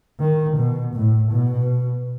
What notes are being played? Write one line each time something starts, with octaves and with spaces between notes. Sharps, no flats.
D#3
B2
A2
B2